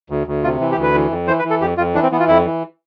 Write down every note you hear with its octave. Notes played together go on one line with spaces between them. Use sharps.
D2
D2
C3 F4
E3
G4
D2
B4
E3
F2
E3 C5
B4
E3
A4
F2 G4
F2 F4
E3 D4
C4
E3 B3
F4
F2 E4
E3